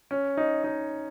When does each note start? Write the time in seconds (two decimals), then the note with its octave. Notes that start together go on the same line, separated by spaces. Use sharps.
0.11 C#4
0.37 D#4
0.64 D#4